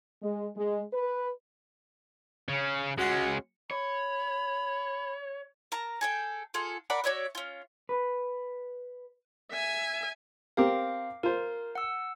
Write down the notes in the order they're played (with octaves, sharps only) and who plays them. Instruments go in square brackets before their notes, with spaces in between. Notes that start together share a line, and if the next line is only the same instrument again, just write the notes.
[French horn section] G#3
G#3
B4
[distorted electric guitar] C#3 C#4
[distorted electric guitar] G#3 C#4 [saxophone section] F#4
[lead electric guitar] C#5 [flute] B5
[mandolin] A#4 A5 A#5
G#4 A4 G5
F4 G#4 A4 F#5
A#4 D5 F#5 B5
F#4 C#5 D5 E5
C#4 F4
[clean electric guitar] B4
[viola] E5 G#5
[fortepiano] C4 G4 A#4 [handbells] F5 D6
[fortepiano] F4 C5 [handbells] A#4
[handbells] F#5 E6